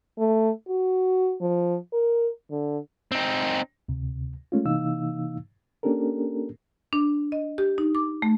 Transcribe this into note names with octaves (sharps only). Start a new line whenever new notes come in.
A3
F#4
F3
A#4
D3
C4 D#4
D2 C3
G#3 A3 C#4 F4
C3 E3 A#3 D#4 F5 E6
A#3 C#4 D4 G4 A4 A#4
D4
D#5
G4
D#4
D6
A3